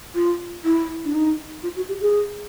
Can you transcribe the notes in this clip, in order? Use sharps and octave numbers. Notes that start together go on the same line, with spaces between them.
F4
E4
D4
D#4
F4
F#4
G4
G#4